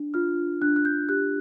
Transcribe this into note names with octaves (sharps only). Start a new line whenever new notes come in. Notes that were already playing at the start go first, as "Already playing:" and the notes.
Already playing: D4
F4 F6
D4 F#6
F#6
G6
G4 F#6